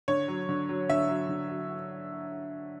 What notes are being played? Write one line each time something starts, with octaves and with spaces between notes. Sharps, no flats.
D3 C#5
F#3
D3
F#3
D3 E5
F#3
D3
F#3